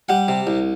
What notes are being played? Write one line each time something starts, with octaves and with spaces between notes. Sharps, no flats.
G3 F#5
C3
C2